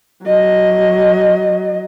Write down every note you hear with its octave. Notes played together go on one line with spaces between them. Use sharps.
F#3 D#5